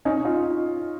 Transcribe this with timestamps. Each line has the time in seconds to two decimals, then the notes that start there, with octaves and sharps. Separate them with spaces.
0.05 C#4 D#4
0.25 D#4 F4